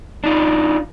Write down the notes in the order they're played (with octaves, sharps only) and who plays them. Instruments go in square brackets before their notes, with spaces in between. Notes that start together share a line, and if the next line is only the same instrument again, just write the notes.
[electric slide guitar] D4 D#4 F4